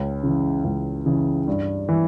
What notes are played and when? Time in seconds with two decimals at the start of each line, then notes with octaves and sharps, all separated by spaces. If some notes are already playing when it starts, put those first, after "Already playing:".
Already playing: C#2 C#4
0.23 C#3 E3
0.64 C#2
1.06 C#3 E3
1.48 G2
1.89 E3